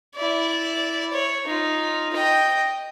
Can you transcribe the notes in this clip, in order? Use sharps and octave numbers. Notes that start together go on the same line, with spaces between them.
E4 D5
C#5
D#4 F4
D#5 G5